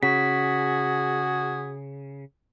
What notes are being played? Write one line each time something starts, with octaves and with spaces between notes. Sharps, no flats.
C#3 F#4 G#4 B6